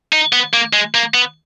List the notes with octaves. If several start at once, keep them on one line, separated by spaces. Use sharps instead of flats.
D#4
B3
A#3
G#3
A#3
B3